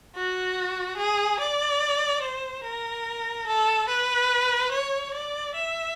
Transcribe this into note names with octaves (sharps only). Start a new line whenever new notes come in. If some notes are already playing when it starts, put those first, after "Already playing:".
F#4
G#4
D5
C5
A#4
A4
B4
C#5
D5
E5